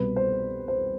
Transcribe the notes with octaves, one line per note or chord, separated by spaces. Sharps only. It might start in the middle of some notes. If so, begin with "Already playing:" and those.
Already playing: C2 B2 B4
C5
C5